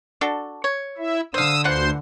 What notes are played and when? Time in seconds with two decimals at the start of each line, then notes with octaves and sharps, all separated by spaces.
0.21 D4 F#4 A4
0.64 C#5
0.98 E4 E5
1.34 D3 C5 F5 D#6 E6
1.64 D2 E3 F4 C5 F#5 C6